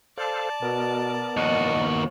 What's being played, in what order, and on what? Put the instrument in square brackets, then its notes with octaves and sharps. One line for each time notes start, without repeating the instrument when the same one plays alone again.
[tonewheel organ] A4 C5 F5 [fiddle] D5 A5
[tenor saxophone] B2 [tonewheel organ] B3 A#4
[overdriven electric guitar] D#2 F#4 [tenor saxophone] D#5